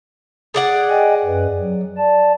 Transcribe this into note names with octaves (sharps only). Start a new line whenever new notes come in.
G#4 D5 F#5
D#5 G5 G#5
F#2 B4
F#3
D5 A5